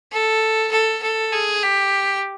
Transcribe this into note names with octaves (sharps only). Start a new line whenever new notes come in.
A4
A4
A4
G#4
G4